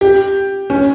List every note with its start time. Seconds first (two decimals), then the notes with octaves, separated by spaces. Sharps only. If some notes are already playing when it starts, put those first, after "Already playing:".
0.01 G4
0.70 C#4